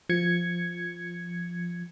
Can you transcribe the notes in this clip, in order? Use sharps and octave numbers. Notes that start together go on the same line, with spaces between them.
F3 G#6 C#7